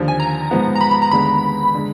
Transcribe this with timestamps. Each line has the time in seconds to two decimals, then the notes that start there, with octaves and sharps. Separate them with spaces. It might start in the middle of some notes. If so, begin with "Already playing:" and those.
Already playing: D#2 D3 F3
0.08 G#5
0.20 A#5
0.51 G#2 F3 G#3 B3
0.76 A#5
0.81 B5
0.91 B5
1.02 A#5
1.11 D#2 D3 G#3 B3 B5
1.75 D3 G#3